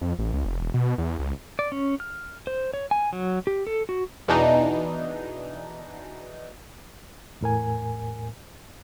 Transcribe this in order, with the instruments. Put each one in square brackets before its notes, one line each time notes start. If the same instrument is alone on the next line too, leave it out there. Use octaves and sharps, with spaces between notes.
[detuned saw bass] F2
A1
C#2
F1
E1
B2
E2
C#2
[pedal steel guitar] D5
C#4
F6
C5
C#5
G#5
F#3
G4
A4
F#4
[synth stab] E2 B2 E3 D4 D#4
[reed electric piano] E2 A2 A#4 G#5